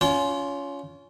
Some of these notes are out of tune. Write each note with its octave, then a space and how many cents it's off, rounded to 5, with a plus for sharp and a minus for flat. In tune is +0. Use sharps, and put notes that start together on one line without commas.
C#4 +25 F4 +0 G5 -30